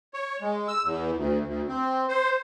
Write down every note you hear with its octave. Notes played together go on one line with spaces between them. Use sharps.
C#5
G#3
E6
E2
D2
D2
C4
C5